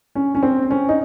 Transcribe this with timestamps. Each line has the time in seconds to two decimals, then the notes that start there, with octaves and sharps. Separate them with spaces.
0.15 C#4
0.35 C#4
0.43 C4
0.71 C#4
0.89 D#4